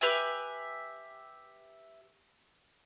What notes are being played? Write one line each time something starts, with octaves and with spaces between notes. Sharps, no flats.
G4 B4 E5 G#5